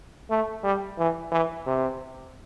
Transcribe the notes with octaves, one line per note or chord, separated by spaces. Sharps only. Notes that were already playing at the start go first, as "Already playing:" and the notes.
A3
G3
E3
E3
C3